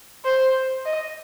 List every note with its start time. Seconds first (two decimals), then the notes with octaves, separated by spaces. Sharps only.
0.25 C5
0.85 D#5